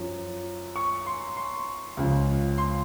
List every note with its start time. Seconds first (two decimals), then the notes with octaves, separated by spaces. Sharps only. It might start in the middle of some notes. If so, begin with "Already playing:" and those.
Already playing: F#2 F3
0.76 C#6
1.06 C6
1.37 C6
1.97 C#2 C#3 F3
2.58 C6